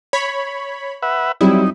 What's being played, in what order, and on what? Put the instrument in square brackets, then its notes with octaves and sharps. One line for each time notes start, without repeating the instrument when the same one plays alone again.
[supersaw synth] C#5 B5
[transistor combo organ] B4 E5 F#5
[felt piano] F#3 G3 C4 [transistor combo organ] D#4 [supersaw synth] E4